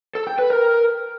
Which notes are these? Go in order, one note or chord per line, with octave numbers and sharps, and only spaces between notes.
A4
G5
B4
A#4